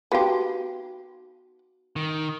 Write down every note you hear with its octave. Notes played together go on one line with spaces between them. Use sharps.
B3 D#4 F#4 G4 F5
D#3